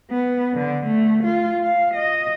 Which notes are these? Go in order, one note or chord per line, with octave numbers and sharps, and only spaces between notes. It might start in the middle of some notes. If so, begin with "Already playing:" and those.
B3
D3
A3
F4
F5
D#5